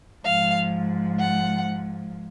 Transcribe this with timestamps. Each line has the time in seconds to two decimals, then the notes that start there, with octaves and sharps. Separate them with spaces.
0.25 G#2 F3 F5
1.19 F#5